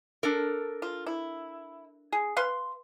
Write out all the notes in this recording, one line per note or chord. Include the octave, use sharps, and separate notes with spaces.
D4 A4 A#4
F4
E4
G#4
B4 F5 C6